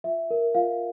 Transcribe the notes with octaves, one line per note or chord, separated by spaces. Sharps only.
F4 E5
A#4 C#5
F4 F5